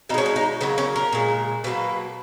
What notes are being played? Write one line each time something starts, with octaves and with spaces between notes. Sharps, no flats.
B2 G#3 C#4 D#4
D#4
D#4
C#3 F#3 A#3 B3
C#4
A#4
A#2 G#3
B2 F#3 A#3 B4